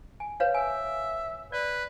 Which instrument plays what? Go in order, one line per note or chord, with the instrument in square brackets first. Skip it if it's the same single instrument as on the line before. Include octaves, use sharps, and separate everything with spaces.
[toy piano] G#5
B4 C#5 F5
[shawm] E5 [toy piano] G#5
[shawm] B4 [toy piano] D5